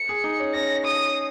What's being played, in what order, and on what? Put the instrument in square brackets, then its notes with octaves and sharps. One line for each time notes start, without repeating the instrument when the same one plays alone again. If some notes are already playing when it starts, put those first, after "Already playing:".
Already playing: [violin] C#7
[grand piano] G#4
D#4
C#4
[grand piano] C#4 [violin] A#6
[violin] D#6